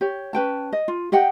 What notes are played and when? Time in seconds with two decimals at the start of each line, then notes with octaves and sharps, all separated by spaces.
0.01 G4 C#5
0.33 C#4 B4 G5 A5
0.73 D#5
0.88 F4
1.12 G4 D#5 F#5 G5